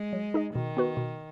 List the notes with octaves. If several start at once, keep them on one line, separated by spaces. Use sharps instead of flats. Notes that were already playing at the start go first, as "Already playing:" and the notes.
Already playing: G#3
F#3
D#4 G#4 D#5
B2 D#3
B3 F#4 B4
B2